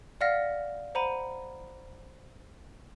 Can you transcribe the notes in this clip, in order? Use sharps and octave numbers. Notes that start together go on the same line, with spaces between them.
D5 F5 F#5 F6 A#6 B6
C5 F#5 A#5 B5 D#7